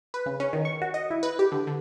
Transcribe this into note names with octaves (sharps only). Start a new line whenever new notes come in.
B4
C#3
C#4
D#3
C#6
F#4
D#5
E4
B4
G4
D3
D3